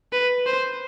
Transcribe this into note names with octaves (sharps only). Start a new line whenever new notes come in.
B4
C5